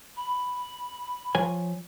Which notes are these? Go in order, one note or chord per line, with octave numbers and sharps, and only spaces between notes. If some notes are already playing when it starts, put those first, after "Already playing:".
B5
F3 C#5 G#5